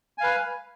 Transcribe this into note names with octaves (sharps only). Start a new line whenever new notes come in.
B4 F5 G#5